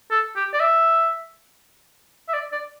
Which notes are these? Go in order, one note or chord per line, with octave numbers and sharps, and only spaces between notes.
A4
G4
D5
E5
E5
D5
D5